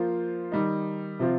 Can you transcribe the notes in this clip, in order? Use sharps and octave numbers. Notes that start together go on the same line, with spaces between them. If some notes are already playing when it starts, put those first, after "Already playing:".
Already playing: F3 A#3 F4 C5
D#3 G3 D#4
C3 F3 C4 F4